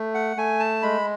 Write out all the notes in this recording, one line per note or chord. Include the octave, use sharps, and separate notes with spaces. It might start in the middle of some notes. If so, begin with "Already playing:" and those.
Already playing: A3
F#5
A3 G#5
A5
G#3 B5